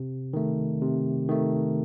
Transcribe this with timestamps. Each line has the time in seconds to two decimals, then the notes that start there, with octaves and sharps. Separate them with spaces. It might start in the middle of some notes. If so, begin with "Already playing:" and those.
Already playing: C3
0.33 D#3 A3
0.81 C3
1.29 D#3 A3